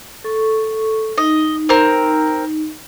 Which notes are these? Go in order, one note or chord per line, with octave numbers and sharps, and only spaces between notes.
A4 C#6
D#4 D#5
C4 A#4